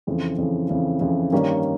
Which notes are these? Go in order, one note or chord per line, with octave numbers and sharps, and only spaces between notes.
F2 C#3 E3
F2 C#3 E3
F2 C#3 E3
F2 C#3 E3
G2 D#3 G3 A#3 C#4